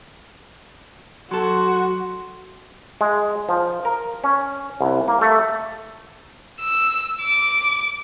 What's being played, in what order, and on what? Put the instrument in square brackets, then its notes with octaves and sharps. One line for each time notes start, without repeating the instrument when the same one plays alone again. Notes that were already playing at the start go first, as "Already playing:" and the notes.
[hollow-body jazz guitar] F#3 A4 [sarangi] F#4 [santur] C6
[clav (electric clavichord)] G#3
F3
A#4
C#4
C2
A#3
A3
[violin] E6
D6